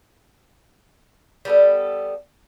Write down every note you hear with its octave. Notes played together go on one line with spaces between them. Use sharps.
G3 B3 A4